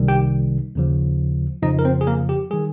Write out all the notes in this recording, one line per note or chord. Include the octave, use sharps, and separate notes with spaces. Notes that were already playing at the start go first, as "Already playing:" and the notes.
Already playing: C2 C3 D#3 G3
G4 G5
D#2 C#3 F3
F2 C#3 F3 D#4 D#5
A#4
C4 C5
G#4
A#3 A#4
G4
D#3 G3 G#4